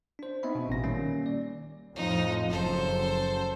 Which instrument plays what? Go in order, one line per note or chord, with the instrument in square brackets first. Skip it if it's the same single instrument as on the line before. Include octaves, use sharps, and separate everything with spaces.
[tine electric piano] D4 C5
B3 C4 D#4 D#5 E5 B5
B2
A1 A#2 A#6
D#3 G3 A#3 C#4
D5
[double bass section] F2 A2 F3 [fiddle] D#4
[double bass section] F#1 F#2 [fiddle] A4 C5